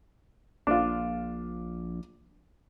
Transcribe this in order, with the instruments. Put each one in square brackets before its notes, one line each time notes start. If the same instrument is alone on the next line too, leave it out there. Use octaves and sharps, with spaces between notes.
[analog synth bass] A#1 [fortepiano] D4 F4